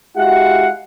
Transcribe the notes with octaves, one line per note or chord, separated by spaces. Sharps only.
G#3 E4 F#4 G4 F5 F#5